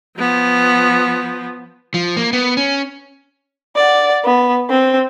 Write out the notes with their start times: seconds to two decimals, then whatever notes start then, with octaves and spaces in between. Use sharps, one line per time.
0.17 F3 B3
1.94 F3
2.16 A#3
2.33 B3
2.57 C#4
3.76 D5 F#5
4.24 B3
4.70 C4